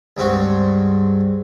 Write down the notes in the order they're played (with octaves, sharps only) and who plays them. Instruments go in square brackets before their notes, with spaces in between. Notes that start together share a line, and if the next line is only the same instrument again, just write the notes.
[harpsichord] C#2 G2 C4 F#4